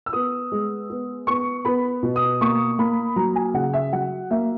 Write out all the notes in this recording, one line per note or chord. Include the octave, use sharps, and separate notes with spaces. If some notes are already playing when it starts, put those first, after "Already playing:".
E6
B3 D#6
G#3
B3
B3 C#6
B3 B5
B2
D#6
A#3 C#6
A#3 B5
F#3 A#5
G#5
C#3 F#5
E5
F#3 F#5
A#3 E5